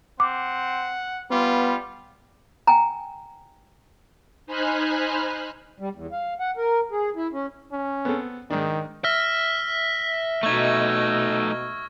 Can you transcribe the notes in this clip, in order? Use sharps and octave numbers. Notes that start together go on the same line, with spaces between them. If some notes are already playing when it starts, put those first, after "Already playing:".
C4 F#5 D6
G3 B3 F4
G5 G#5 A#5
D#4 C5 G#5 B5 F6 F#6
G3
E2
F5
F#5
A#4
G#4
E4
C#4
C#4
B3 C4 A4
G#2 D#3 D4
E5 E6 F6 A#6
B2 A3 D#4 C#6 G#6